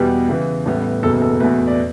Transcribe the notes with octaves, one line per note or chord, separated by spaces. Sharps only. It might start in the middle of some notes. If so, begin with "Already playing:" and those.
Already playing: E2 B2 G3 B3 G4
E2 C#3 E3
A1 A2 G3 B3
F#1 E2 B2 A4
A4
E2 B2 A3 B4
D5